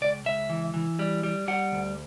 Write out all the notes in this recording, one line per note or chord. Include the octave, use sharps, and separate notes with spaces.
C#2 D5
C#2 E5
E3
E3
G3
G3
G3 F#5
D2